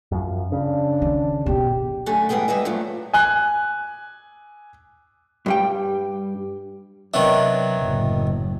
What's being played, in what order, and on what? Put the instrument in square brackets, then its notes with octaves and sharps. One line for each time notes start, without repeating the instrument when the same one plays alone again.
[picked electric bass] F#2 F3
[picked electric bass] C#3 [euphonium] D4
[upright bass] D#3
[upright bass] B2 B3 [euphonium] G4
[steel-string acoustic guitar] F#2 D3 A3 G#5
E2 G#2 G3 B3 G#4 G5
G3 G#4 B4 D#5 E5
G2 A#2 F3 F#3 A3
[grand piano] G#5 F#6
[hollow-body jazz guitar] G2 G3 G5
[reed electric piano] C3 C#5 E5 [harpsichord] D#3 B3 D4 [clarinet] F#3
[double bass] F#1 A2